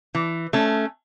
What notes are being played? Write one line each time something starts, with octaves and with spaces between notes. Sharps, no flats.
E3
A3 C#4